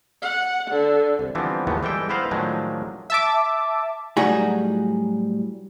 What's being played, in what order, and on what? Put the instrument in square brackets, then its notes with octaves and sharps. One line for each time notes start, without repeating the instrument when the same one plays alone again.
[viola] F#5
D3
[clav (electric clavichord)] C2
D3 E3 F3 G3 B3 C4
D#2 G#2 E3 F3 A3 B3
E3 G3 G#3 A4 G5
B3 E4 B4 C5 F5 A#5
A2 D#3 F3 F#3 G#3 D4
[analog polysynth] E5 A5 D6
[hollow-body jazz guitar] A2 F#3 G3 D#4 F#4 G#4